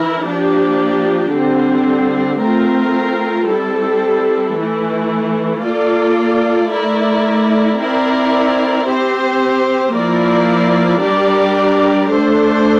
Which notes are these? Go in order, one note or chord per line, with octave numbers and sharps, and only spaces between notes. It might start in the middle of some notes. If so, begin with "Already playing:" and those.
Already playing: E3 E4 A#4
F3 A#3 D4 G4
D3 G3 C4
A3 C4 F4 A#4
G3 C4 E4 A4
E3 A3 E4
A#3 F4 A4 D5
A3 E4 A#4 D5
C4 E4 A#4 D5
C4 G4 C5
F3 A#3 E4 A#4 D5
G3 D4 G4 A#4 D5
A3 D4 A4 C5